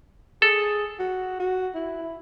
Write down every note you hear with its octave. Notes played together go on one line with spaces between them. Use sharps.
G#4 A4
F#4
F#4
E4